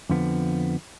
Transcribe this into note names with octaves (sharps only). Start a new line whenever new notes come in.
F2 D3 F3 B3